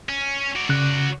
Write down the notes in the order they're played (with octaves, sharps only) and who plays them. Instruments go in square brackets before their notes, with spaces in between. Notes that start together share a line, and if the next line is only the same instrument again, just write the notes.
[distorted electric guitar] C#4
F#4 D5
[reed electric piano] C#3 F#6